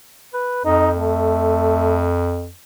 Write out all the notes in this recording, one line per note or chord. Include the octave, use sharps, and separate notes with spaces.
B4
F2 D#4
A3